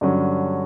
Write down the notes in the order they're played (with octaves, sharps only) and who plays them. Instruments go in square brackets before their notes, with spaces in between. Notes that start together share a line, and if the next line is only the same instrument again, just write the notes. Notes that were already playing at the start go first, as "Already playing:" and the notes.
[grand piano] G2 D3 F#3 C#4